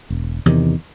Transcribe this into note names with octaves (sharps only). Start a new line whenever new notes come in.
E1
E2 C3 D#3